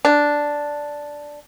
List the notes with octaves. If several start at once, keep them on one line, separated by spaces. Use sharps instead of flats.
D4